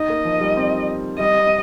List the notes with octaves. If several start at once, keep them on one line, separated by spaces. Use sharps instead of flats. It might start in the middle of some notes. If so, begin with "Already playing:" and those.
Already playing: D#4 D#5
A#3
F3
G3
C4
G3 D#5